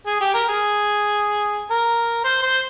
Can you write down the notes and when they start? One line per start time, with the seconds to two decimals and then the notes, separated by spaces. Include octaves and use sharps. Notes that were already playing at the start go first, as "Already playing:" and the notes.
0.06 G#4
0.21 G4
0.34 A#4
0.49 G#4
1.71 A#4
2.25 C5
2.43 C5